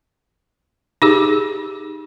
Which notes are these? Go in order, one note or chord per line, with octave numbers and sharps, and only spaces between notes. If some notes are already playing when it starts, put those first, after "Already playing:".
D#4 G4 G#4